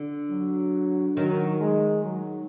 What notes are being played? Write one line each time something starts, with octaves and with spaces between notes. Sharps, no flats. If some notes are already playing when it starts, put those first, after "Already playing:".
Already playing: D3
F#3
D#3 F#3
G#3
F#3